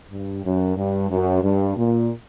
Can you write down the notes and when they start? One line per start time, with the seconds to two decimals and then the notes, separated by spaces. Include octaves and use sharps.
0.12 G2
0.44 F#2
0.77 G2
1.11 F#2
1.43 G2
1.77 A#2